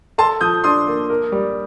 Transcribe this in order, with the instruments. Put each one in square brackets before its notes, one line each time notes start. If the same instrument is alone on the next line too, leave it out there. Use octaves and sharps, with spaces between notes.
[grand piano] A4 [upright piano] A5 C6
[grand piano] F3 [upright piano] D#6 G6
[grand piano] D4 [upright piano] C6 D#6
[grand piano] A#3
A#4
G3